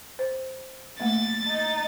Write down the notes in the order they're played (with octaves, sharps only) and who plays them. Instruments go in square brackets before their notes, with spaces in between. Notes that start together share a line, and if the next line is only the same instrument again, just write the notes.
[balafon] C5
[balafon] A3 A#3 E5 [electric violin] A6
[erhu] D#4